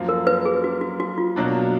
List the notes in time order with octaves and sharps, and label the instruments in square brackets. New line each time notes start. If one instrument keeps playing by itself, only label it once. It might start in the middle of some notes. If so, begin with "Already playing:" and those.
Already playing: [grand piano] F#2 F3 A#3
[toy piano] A#4
B4
G#4
F#4
F#4
F#4
F4
[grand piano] B2 F#3 A#3 D4